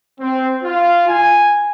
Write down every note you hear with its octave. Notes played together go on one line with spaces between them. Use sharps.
C4
F4
G#5